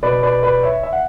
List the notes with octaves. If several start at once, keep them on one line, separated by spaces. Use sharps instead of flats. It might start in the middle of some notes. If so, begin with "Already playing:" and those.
B2 B4 D5
B4 D5
B4 D5
C#5 E5
E5
F#5